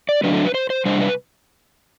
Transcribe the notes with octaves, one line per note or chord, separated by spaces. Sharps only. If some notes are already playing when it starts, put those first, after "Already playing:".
D5
D3 F#3 A3 D4 B4
A4
B4
C5
C5
C3 G3 D4 C5
B4